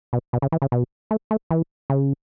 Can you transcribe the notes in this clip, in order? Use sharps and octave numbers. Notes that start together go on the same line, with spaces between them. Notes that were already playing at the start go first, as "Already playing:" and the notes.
B2
B2
C#3
E3
C#3
B2
A3
A3
E3
C#3